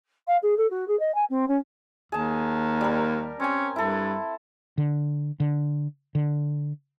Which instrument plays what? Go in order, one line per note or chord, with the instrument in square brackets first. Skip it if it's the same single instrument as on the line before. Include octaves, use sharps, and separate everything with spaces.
[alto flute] F5
G#4
A4
F#4
G#4
D#5
G#5
C4
C#4
[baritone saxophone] D#2 [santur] G#4 A5
[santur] G3 A#4
[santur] C4 G#5 [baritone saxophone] C#4
[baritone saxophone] G2 [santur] E4 A4
[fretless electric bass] D3
D3
D3